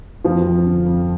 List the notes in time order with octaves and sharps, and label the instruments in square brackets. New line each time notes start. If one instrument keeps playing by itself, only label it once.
[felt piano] F2 [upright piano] F3 F4
[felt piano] F2
D3
F2